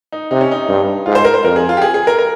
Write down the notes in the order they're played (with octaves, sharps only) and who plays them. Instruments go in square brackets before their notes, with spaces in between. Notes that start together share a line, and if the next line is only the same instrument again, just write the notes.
[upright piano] D#4
[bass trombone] C3 [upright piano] D#4
[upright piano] C#4
D#4
[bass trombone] G2
[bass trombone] G#2 [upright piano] F4
[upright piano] C5
A#4
C5
[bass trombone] F2 [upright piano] A#4
[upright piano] G#4
F4
G4
G#4
G#4
A#4
A#4